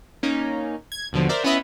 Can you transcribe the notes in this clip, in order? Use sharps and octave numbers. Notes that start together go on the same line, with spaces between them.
A#3 C#4 D#4
G#6
D#2 B2 D3 F3
A#4 C5 D5 E5
B3 C#4 E4 B4 D#5 E5